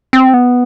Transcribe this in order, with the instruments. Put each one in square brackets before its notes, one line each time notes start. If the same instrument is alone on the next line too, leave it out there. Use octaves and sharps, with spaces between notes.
[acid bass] C4
B3